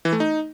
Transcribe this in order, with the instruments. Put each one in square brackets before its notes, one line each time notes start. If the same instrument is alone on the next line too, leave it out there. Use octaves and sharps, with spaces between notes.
[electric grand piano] E3
A3
D#4